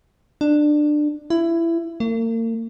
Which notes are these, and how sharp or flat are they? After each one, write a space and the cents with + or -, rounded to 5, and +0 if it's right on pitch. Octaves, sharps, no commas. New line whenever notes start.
D4 +20
E4 +20
A#3 -40